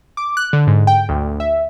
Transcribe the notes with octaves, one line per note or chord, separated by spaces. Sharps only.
D6
F#6
D3
G#2
G5
D2
E5